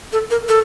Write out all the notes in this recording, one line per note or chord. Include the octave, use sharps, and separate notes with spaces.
A4
A#4
A4